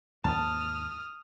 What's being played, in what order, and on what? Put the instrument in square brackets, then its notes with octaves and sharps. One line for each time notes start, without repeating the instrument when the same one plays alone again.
[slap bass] D#2 G#2 A#3 [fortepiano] A5 [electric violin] D#6 F6